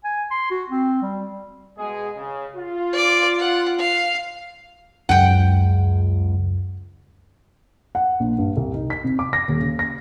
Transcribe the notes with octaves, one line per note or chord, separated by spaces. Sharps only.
G#5
C6
F#4
C4
G3
B2 G#3 G#4
C#3
F4
D5 D6
F#5
F5
C#2 F#2 F#5 G5
F#5
A#1
G2
C2
D#4
B6
C3
D6
A#6
D#1
C#3
A#6